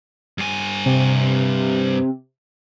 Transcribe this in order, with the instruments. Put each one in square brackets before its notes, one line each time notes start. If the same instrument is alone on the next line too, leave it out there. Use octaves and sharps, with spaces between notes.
[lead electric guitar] G2 G#5
[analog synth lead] C3